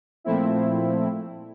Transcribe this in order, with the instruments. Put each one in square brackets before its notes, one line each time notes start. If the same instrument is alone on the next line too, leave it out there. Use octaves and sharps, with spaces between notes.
[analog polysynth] A#2 F3 A3 C4 E4